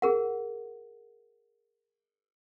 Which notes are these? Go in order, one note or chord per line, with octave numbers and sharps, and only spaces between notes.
G#4 A#4 F#5